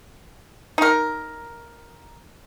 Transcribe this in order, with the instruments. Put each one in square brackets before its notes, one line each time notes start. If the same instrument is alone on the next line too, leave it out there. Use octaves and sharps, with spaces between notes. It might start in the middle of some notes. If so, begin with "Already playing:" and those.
[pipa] D#4 A#4